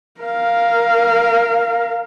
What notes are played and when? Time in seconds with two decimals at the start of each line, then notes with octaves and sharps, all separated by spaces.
0.21 A#4 F5